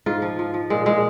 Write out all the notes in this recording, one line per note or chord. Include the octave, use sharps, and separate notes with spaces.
G#2 F4
F3
F3
F3
A#2 G#3
A#2 G#3